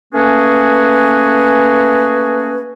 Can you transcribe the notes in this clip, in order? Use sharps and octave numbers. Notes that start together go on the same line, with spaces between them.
A3 A#3 C#4 F#4 G#4 B4